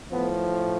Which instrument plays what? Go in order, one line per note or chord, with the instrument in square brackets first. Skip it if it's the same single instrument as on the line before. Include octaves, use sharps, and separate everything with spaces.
[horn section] A2 F3 B3